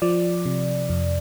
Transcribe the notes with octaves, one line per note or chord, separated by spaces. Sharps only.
F3 D5
C3
F2